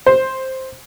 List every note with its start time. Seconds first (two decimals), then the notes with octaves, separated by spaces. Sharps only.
0.07 C5